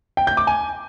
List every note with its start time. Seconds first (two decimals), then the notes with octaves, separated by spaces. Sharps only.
0.17 G5
0.27 G6
0.37 D6
0.47 G#5